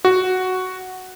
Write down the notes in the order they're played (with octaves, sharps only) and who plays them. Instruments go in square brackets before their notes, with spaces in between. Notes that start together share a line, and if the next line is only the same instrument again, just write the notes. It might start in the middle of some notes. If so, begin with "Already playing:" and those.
[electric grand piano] F#4